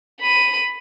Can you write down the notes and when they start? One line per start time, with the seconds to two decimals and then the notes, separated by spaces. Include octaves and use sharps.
0.21 B5 D#7